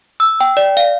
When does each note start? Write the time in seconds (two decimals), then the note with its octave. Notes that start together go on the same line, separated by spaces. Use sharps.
0.20 E6
0.41 G5
0.57 D5
0.77 F5